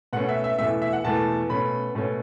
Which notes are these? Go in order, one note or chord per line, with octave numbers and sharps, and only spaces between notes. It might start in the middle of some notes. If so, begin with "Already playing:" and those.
B2 A3 C#4 F#5
E5
E5
E2 B2 A3 E5
E5
F#5
E2 B2 A3 A5
B2 A3 C#4 B5
B2 A3 C#4